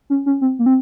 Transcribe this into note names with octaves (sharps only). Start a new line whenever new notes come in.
C#4
C#4
C4
A#3
C4